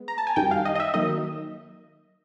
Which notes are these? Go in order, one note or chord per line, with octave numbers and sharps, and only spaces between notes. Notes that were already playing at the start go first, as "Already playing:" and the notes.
Already playing: G#3 B3
A#5
A5
G#5
F#2 D#3 G3 G5
F5
D#5
D#5
E5
D#3 F#3 A#3 D#4 D#5